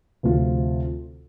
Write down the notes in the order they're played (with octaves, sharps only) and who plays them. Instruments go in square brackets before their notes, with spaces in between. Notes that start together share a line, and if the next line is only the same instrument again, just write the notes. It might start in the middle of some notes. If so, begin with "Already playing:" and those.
[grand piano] D2 C3 F3 C4 F4